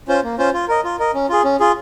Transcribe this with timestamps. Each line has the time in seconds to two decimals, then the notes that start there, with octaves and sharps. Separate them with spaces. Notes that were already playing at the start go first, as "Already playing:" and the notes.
0.08 C#4 F4 C5
0.23 A#3
0.38 C#4 F4 C5
0.53 F4
0.68 A#4 D#5
0.84 F4
0.99 A#4 D#5
1.14 C#4
1.29 F4 G#4
1.44 C#4
1.60 F4 G#4